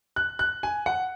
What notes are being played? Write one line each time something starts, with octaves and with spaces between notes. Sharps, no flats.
F#6
F#6
G#5
F#5